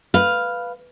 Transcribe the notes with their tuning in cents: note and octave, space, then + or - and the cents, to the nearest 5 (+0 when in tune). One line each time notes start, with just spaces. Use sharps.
B4 +0 F5 +0